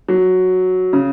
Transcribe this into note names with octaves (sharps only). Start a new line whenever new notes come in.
F#3
C#3